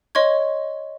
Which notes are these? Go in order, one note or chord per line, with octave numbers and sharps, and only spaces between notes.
C#5 D#5 C6 C#6 G#6